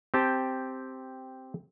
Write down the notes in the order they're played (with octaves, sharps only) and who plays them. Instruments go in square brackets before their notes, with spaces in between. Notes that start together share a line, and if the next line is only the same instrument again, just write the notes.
[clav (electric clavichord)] C4 G4 G5 A5